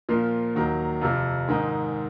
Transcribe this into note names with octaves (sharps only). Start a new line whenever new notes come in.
A#2 F3 A#3 F4
D#2 D#3 F#3
F2 C3 F3
G#2 D#3 G#3